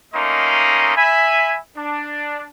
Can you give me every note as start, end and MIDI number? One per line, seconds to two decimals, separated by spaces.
0.14 0.95 57
0.14 0.95 58
0.14 0.95 61
0.14 0.95 63
0.14 0.95 75
0.14 0.95 84
0.96 1.57 76
0.96 1.57 80
0.96 1.57 83
1.77 2.46 62